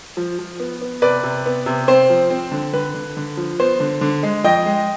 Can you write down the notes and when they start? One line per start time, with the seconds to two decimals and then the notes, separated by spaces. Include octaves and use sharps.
0.17 F3
0.39 F3
0.60 B3
0.82 B3
1.02 C3 B4 D5
1.23 C3
1.46 B3
1.66 C3
1.88 C4 C5
2.10 F3
2.30 C4
2.51 D3
2.73 D3 B4
2.94 D3
3.17 D3
3.37 F3
3.60 B3 C5
3.80 D3
4.01 D3
4.23 G#3
4.44 F2 D#5 G5
4.66 G#3